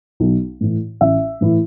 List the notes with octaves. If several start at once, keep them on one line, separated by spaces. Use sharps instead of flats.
B1
A2 E3
A1 E5
A2 E3